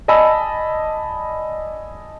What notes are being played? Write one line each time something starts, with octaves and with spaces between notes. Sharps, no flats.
D5 D#5 G#5 A5 B5 E6